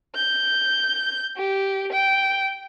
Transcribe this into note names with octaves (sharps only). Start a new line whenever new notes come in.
G6
G4
G5